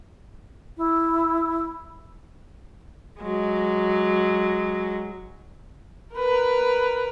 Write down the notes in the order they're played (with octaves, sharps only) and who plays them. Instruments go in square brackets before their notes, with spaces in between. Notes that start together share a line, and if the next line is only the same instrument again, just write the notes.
[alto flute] E4
[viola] F#3 G#3
A#4 B4